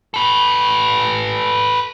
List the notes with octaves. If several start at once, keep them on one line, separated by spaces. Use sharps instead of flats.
A4 B4